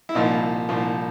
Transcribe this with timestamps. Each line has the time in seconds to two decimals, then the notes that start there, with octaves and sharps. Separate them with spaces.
0.09 E4
0.15 C2 A#2 F3 D#4
0.69 C2 A#2 F3